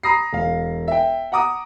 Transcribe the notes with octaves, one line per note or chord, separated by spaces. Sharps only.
A#5 B5 D#6 A#6 C7
E1 F5
E5 G5
F#5 A#5 D6 D#6